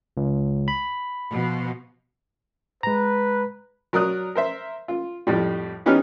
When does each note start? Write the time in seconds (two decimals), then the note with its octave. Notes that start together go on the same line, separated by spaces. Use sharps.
0.17 C#2
0.68 B5
1.32 B2 F3
2.83 G#3 B4 A#5
3.93 F#3 A#4 D5 D#6 F#6
4.35 A#4 C5 E5
4.88 F4
5.27 F2 A2 G3
5.86 E3 B3 C#4 D#4 G4 F6